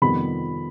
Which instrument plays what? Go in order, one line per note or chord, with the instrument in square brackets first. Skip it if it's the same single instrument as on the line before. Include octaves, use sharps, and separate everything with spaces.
[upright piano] F2 C3 D#3 G3 B3 B5